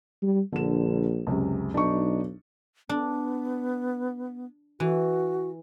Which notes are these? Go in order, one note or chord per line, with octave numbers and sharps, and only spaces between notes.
G3
A#1 D3 E7
C#2 F#2 C3
B1 D4 D#4 C#6
B3 D4
E3 F#4